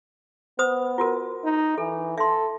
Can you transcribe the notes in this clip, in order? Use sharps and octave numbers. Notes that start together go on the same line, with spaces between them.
B3 C5 D#6
F4 F#4 A#4
D#4
E3 A4
A4 E5 C6